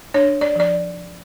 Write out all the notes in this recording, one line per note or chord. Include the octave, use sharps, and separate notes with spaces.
D4 C#5
D5
F3 D5